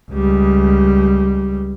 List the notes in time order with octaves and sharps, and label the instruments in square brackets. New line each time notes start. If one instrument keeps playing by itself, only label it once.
[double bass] C#2 G3